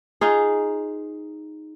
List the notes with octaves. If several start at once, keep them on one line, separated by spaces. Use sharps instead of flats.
D#4 F4 G#4